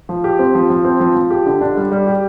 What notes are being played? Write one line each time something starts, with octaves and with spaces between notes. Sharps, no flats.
F3
G4
C4
F3
F3
C4
F3
F3
G4
D3
D4
G3
G3
G4